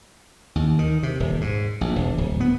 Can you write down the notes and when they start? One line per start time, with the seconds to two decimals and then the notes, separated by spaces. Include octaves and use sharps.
0.55 D#2
0.79 D#3
1.03 C3
1.20 D#1
1.41 G#2
1.81 A#1
1.96 E1
2.18 D1
2.40 B3